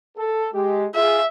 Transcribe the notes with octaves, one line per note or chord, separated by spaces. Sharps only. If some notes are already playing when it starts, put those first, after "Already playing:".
A4
G#3 G4
F4 G#4 E5